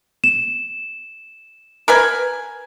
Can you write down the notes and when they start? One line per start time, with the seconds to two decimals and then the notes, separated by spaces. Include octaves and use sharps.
0.24 E7
1.88 A#4 B4 G#5